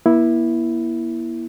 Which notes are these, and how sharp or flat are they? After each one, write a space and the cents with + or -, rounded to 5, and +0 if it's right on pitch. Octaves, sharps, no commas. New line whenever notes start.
A#3 +45 E4 +0